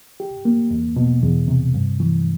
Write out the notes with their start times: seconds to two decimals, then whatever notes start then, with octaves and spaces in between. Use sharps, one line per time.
0.20 G4
0.45 A#3
0.71 E2
0.96 B2
1.23 E2
1.48 C3
1.74 G2
2.00 E3